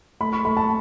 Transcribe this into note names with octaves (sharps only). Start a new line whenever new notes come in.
A3 B5
C#6
A3 B5
A5